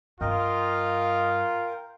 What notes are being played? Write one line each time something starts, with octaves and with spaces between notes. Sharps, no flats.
G2 F4 A#4 D#5 F5 G5